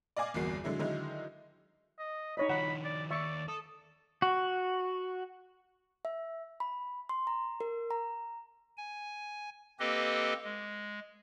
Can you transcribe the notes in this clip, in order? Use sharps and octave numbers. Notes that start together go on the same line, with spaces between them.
D5 D#5 F5 G#5 D6
G1 E2 A#3 F#4 C7
D3 F#3 G#3 E4
D3 D#3 F#3 G#3 D#4 E4
D#5
D#4 C#5 D#5 B5
D#3 F3 F#5 B5
D5
D#2 D5 E5 C#6
A4 D#6
F#4
E5
B5
C6
A#5
A#4
A#5
G#5
A#3 C4 G4 A4 B4 D#5
G#3